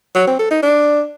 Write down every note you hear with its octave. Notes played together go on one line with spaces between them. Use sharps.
F#3
C4
A4
D#4
D4